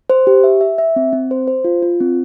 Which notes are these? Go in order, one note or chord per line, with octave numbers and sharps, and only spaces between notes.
C5
G4
E5
E5
E5
C4
C4
C5
C5
F4
F4
C4